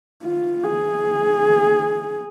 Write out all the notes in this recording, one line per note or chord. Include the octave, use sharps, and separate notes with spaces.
F4
G#4